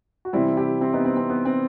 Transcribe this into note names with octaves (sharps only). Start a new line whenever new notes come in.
F#4
C3 E3 G3 C4 E4
E4 G4
C4 E4
B3 D#4
C4
C4
B3
C4